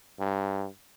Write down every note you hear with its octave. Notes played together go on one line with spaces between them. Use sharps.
G2